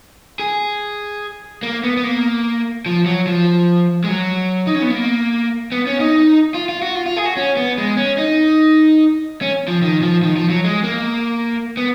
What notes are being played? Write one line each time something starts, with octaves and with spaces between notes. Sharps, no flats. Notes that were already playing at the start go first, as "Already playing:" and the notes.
G#4
A#3
B3
B3
A#3
F3
F#3
F3
G#3
F#3
D#4
C#4
B3
A#3
B3
C#4
D#4
F4
F4
F#4
F4
F4
G#4
F#4
C#4
B3
G#3
C#4
D#4
C#4
F3
D#3
F3
D#3
F3
F#3
G#3
A#3
B3